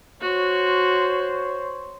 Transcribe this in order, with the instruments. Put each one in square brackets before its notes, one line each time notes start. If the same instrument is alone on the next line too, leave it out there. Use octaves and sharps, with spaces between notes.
[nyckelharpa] F#4 [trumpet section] C5 C#5